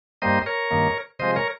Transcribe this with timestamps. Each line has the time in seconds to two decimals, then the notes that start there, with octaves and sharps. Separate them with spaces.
0.22 G2 G3 A#3 C5 D#5
0.46 A#4 C#5
0.71 G2 D#3 A#3
1.19 C3 F3 G#3 C5 D#5
1.36 A#4 C#5